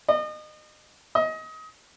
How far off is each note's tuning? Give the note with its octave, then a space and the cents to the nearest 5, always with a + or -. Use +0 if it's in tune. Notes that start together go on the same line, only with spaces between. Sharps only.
D#5 -35
D#5 +25